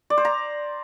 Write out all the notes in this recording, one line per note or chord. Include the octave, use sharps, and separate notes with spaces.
D5
C5
A#5